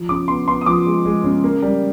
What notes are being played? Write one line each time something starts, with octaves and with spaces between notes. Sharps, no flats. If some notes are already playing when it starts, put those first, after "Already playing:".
Already playing: F3
C#3 D6
B3 C6
B3 C6
D#6
F3 D6
G#3
G#3
C#3
A#3
G3